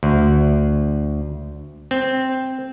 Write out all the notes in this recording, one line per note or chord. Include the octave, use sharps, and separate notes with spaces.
D2
C4